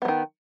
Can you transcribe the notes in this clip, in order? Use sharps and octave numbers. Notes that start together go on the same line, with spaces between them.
D#3 F#3 B3